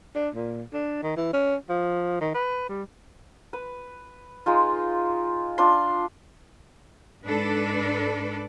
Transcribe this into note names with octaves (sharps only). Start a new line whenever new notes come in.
D4
A#2
D4
D#3
E3
C#4
F3
D#3
B4
G3
B4
G#3 D#4 F4
D4 F4 C6
G#2 D4 A4 B4 D5